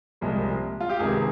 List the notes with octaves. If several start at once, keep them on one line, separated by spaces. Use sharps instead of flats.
C2 A#2 F3 G#3
F4
G4
C#2 C3 D#3 G#4